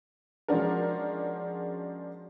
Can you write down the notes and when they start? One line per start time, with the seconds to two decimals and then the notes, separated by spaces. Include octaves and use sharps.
0.48 F3 G#3 C#4 D4 F#4 A#4